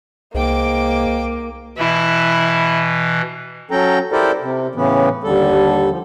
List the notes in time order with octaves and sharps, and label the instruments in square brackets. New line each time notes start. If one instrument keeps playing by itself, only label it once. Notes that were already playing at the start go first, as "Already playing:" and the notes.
[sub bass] C2 [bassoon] G#2 [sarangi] A#3 [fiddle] G5 D6
[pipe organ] B2 E3 [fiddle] E4
[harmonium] F#3 C#4 A4 G5 A#5
E4 G4 A4 A#4 C5 D5
C3
A2 C#3 E3 B3
D#2 D3 G3 A4
F3